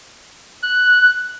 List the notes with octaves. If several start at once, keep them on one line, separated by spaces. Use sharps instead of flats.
F#6